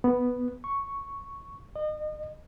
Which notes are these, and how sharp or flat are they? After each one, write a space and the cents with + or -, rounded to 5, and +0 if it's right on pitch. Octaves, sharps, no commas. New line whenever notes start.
B3 +0
C#6 +0
D#5 -35